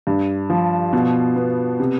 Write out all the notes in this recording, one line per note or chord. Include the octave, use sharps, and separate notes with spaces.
G2
F3
B2
B3
C3